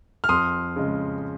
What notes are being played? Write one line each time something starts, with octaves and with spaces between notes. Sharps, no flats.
F6
F2 C6 D#6
C#3 G#3